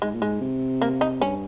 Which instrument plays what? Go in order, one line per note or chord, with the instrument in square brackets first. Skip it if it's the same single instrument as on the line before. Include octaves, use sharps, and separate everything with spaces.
[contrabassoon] G#2 [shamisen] G#3
[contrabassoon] A#2
[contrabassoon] G#2 [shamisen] G#3
[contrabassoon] C3
[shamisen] A#3
D#4
[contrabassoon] G2 [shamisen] C#4